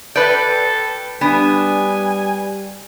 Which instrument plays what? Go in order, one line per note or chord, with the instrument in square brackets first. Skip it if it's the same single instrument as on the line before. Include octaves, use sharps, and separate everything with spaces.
[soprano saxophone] A4 [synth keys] B4 G5 [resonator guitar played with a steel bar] D5
[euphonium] G3 [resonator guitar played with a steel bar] B3 D4 [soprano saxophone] G#5